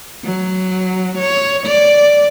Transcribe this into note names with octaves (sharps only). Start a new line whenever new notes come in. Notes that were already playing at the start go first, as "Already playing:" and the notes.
F#3
C#5
D5